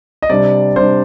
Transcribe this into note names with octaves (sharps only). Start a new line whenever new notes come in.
D#5
C3 G3 D4 D5
C3 G3 D4 C5